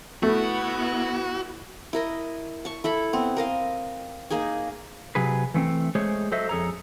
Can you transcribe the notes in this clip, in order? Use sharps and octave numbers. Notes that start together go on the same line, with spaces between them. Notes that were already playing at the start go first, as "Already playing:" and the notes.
A3 B3 E4 F#4
E4 A#4 D#5
A5 C#6
E4 A4 B5
B3 C4
A#4 D#5 F5
A#3 D#4 G#4 G#5
C3 F#3 G#4 B4
E3 A3 B3 C4
G#3 A3 G#4 C5 C#5
F#3 A4 C5 D#5 E5
F2 G#4 A4 C#5 A#5